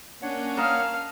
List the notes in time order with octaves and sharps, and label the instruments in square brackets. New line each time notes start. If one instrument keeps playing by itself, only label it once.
[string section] A#3 C#4 [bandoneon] D4 C#5 F#5
[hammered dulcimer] A#4 D#5 A5 [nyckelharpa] F5